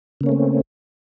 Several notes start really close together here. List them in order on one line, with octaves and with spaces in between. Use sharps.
C#3 A#3 C#4 A3 C4